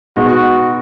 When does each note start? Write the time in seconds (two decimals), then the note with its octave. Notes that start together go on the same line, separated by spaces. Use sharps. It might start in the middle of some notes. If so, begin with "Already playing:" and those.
0.16 B2 G#3 D#4 F#4